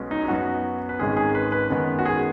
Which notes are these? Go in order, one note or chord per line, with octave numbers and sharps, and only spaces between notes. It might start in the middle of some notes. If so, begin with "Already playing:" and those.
Already playing: B1 B2 G#3 C#4
D#4
D#4
F#2 F#3 B3 F#4
B4
G#1 G#2 D#3 G#3 C#4 G#4
G#4
B4
B4
F#2 D#3 G#3 B3
F#4
G#4